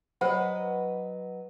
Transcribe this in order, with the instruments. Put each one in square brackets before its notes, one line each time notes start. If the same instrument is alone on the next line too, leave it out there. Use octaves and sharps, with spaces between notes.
[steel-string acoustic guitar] F#3 B4 D#5 [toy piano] C5 F#5 B5